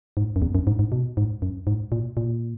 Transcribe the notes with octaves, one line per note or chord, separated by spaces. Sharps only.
G#2
F#2
E2
F#2
G#2
G#2
B2
G#2
F#2
G#2
A#2
A#2